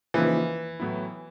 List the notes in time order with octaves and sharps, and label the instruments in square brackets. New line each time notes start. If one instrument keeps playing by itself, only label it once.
[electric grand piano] C#3 F3 A#3 D#4 [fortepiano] E3
[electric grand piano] A2 F#3 B3 E4